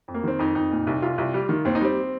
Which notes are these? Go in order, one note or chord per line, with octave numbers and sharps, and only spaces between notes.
F2
A#3
D#3 C4
F2 D#4
F2 D#4
A#2
C2
C2 F4
C2
G3
D#3
D#2 C4
D#4
G3 C4